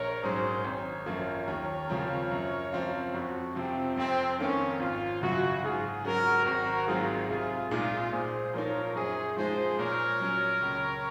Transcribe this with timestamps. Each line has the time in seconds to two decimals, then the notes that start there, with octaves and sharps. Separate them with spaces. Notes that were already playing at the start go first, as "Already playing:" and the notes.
Already playing: A#1 A#4 C#5
0.23 G#2 F#3 C#4 G#4 C5
0.64 G#1 A#4 C#5
1.06 F#2 F3 A#3 F4
1.48 D#2
1.89 C#3 F3 C4
2.31 F#2
2.72 F3 C4 F4
3.14 F2 F#4
3.55 C3 F3 C4
3.97 F2 C4
4.39 D#3 A#3 C#4 D#4
4.80 G#1 F4
5.21 F#2 C#3 F#3 F#4
5.63 G#2 F4 G#4
6.04 F#3 C#4 F#4 A#4
6.46 G#1 F#4 A#4
6.87 G#2 F#3 C4 D#4 F4 G#4
7.29 C2 F4 G#4
7.71 A#2 G#3 D#4 F4 G#4
8.12 A#2 G#4 C5
8.54 F3 A#3 D#4 A#4 C#5
8.95 F#2 G#4 C5
9.37 F3 G#3 D#4 G#4 C5
9.78 A#2 A#4 C#5
10.20 F#3 C#4
10.62 C#2